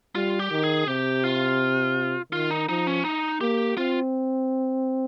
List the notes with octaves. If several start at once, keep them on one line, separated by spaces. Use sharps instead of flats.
G3 F4
G4
D#3
G#4
C3 G4
F4
D#3 F4
D#4
F3 D#4
C#4
D#4
A#3 G4
C4 F4